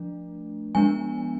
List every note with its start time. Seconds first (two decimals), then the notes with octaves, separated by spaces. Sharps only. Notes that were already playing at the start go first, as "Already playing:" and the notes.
Already playing: F3 A3 D4
0.75 F3 G#3 B3 D4 G#5